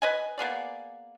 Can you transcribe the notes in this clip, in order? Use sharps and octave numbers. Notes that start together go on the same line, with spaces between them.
B4 D#5 G#5
A#3 B3 G#4 D5